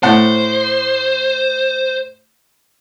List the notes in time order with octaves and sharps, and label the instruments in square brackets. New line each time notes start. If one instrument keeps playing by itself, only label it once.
[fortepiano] A2 F#5 A5 [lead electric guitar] C5